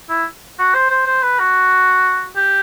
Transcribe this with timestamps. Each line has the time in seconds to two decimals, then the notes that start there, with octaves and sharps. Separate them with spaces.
0.09 E4
0.59 F#4
0.74 C5
0.90 C5
1.07 C5
1.23 B4
1.39 F#4
2.36 G4